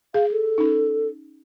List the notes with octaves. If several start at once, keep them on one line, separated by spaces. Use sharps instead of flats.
G#4 F5
A4
C#4 D#4